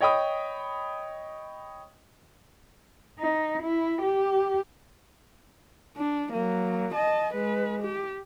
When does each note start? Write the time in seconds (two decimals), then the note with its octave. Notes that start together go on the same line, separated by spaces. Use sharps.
0.01 C#5 D#5 G5 B5 D#6
3.19 D#4
3.63 E4
4.02 G4
5.97 D4
6.33 F#3 A#3
6.94 D#5 A5
7.34 G#3 B4
7.83 G4